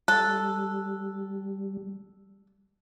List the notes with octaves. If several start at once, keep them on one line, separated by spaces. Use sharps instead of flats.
G3 A4 F#6